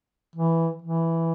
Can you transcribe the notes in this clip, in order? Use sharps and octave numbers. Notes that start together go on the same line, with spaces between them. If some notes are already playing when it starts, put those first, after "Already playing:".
E3
E3